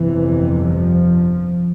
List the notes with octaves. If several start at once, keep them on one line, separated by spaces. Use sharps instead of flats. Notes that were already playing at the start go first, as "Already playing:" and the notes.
Already playing: G1 F2 C3 E3
F3